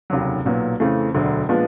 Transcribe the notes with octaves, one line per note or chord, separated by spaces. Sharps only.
F1 D#2 C#3 F#3
B1 A#2 F#3 B3
F2 C#3 E3 A3
E1 D2 D3 F#3
A#2 F3 G#3 B3 D4